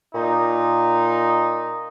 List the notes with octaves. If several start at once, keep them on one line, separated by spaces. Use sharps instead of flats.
A#2 D#4